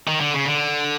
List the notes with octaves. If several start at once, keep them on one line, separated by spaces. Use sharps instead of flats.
D#3
D3
C#3
D3